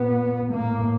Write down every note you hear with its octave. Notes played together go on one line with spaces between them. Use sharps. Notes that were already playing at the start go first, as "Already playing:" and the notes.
Already playing: A#2 B3
A2 A#3